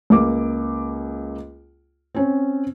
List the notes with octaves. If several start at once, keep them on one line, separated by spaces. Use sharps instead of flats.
C#2 A#3 D6
C4 C#4